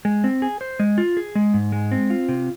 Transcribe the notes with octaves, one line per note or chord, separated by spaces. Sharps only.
G#3
C4
G#4
C5
G#3
F4
G#4
G#3
G#2
G#3
C4
F4
C3